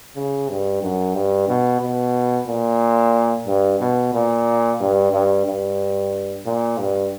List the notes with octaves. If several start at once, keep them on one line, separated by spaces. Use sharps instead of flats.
C#3
G2
F#2
G2
B2
B2
A#2
G2
B2
A#2
G2
G2
G2
A#2
G2